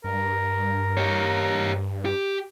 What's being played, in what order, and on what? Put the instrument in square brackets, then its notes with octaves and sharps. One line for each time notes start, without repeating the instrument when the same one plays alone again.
[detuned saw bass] G2 [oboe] A#4
[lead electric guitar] G4 C#5
G4